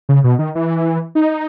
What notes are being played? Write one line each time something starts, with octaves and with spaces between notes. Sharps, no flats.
C#3
B2
D#3
E3
D#4